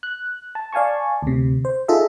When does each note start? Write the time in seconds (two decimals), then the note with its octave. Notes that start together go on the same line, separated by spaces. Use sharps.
0.03 F#6
0.55 A5
0.73 D5 F5 G#5 A5 C#6
1.22 D2 C3
1.65 C5
1.88 D#4 F4 G#4 A4 D#5 E5